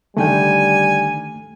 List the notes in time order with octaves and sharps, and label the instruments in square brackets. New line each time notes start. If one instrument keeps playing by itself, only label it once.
[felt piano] D3 D#3 [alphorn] G3 [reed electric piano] A3 G5 [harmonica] G#5